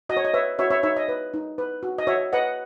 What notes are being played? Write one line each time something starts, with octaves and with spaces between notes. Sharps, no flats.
F#4 D#5
C#5
D#5
B4 C#5 E5
F#4 C#5 E5
C#5 E5
D#4 C#5 E5
D#5
B4
D#4
B4
F#4
D#5
F#4 C#5 E5
B4 D#5 F#5